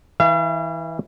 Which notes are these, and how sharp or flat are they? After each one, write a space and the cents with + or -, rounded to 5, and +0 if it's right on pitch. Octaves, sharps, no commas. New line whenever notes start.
E3 -20 F5 -45